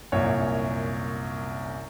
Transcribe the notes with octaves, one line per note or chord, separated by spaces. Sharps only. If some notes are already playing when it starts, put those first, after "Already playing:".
C2 F#2 A#2 C#5